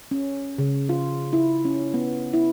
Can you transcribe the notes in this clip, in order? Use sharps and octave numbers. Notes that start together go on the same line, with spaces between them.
C#4
C#3
F4
E4
C#4
B3
E4